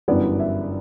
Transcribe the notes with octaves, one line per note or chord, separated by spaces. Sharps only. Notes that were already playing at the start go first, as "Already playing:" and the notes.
G1 F#2 E3 G3 B3 D5
E5